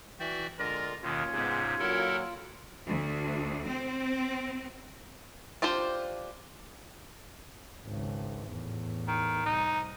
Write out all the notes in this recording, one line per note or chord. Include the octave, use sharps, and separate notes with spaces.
E3 F#4 D5 E5 G5
D3 G#3 F4 A#4 D5
D#2 B2 D#3 C#4 F4
G#2 C3 G#3 B3
A#2 F#3 E4 A4 A#4
D2
C4
D4 F4 G4 C5
G#1 C#2
E2 A2
D#3
C2 D#4